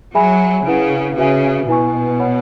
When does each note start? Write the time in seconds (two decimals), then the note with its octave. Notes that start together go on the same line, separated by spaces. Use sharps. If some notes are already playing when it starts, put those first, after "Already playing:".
0.15 F#3 G#4 E5 G#5 B5
0.66 C#3 E4 B4 F#5
1.17 C#3 F#4 B4 E5 G#5
1.69 B2 E4 B4 G#5 C#6
2.19 C#5 F#5 B5